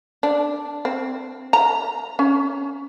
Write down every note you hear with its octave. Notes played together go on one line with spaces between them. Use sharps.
D4
C4
A#5
C#4